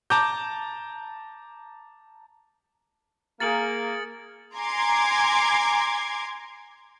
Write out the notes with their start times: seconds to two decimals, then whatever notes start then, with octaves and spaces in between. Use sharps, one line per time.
0.10 A5 A#5 D6 G6
3.40 A#3 G#4 A#4 A6 C#7 F#7
4.56 G#5 A#5 C6 D6 G#6